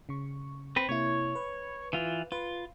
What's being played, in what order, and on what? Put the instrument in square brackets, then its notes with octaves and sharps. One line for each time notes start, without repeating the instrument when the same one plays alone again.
[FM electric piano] C#3 C#6
[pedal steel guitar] C4 B4
[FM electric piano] C3 A#3 E4 [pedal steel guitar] C#5
[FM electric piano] B4
[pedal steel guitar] E3 F4
[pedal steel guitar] F4 [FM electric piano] B4